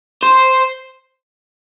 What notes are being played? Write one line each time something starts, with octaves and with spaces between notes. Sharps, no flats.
C5